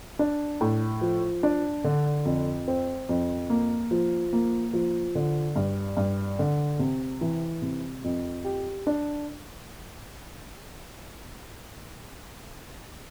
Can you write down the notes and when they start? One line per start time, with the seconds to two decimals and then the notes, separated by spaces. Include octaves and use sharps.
0.19 D4
0.61 A2
1.01 F3
1.43 D4
1.84 D3
2.25 F2
2.68 C4
3.09 F2
3.50 A#3
3.91 F3
4.33 A#3
4.73 F3
5.15 D3
5.56 G2
5.97 G2
6.39 D3
6.79 C3
7.21 E3
7.62 C3
8.04 F2
8.45 G4
8.87 D4